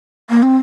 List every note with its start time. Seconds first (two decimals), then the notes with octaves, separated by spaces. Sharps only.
0.30 A#3
0.42 C4